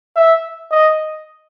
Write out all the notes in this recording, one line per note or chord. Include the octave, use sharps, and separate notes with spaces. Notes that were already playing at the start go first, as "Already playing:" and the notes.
E5
D#5